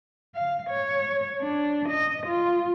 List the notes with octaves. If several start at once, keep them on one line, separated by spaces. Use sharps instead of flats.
F5
C#5
D4
D#5
F4